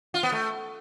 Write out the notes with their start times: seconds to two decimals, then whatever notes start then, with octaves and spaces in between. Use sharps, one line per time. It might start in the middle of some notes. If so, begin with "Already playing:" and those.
0.14 F4
0.23 B3
0.32 A3